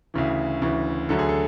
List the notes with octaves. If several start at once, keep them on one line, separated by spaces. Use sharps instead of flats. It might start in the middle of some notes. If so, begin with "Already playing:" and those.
D2 C#3 E3
D2 C#3 E3
D2 D3 F#3 A4
G#4
A4